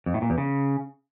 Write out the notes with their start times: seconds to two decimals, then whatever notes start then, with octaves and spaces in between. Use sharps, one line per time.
0.06 F2
0.14 A2
0.22 A#2
0.30 E2
0.38 C#3